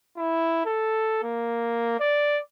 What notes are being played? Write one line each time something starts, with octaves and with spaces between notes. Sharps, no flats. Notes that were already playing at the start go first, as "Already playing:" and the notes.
E4
A4
A#3
D5